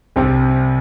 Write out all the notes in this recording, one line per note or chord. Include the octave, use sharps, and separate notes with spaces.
C2 C3 G3